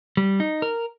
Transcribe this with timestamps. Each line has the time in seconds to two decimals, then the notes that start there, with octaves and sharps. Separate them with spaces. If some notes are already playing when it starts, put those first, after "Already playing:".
0.17 G3
0.40 D#4
0.62 A#4